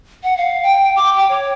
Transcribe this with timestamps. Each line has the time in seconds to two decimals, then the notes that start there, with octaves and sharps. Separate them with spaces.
0.24 F#5
0.37 F5
0.63 G5
0.96 D6
1.13 G5
1.29 C#5